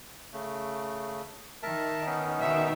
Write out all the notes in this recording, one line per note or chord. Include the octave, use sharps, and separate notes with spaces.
C#3 A3
D#3 A#4 E5 A5
B3 C#4 D#4
B2 D#3 E5